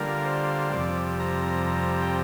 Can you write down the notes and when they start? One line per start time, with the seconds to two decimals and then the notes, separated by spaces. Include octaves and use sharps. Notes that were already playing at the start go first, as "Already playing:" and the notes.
Already playing: D3 G3 A#3 F4 A#4
0.25 C5
0.72 F2 C3 G3 D5
1.20 A#5
1.43 A#5
1.67 A#5
2.02 G5